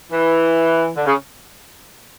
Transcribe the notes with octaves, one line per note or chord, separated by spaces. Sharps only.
E3
D3
C#3